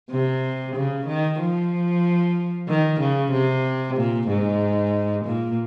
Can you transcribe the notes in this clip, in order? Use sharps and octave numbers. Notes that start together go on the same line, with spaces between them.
C3
C#3
D#3
F3
D#3
C#3
C3
A#2
G#2
A#2